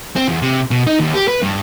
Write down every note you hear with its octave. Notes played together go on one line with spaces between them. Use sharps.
C4
E2
C3
B2
D#4
D#2
G4
B4
G2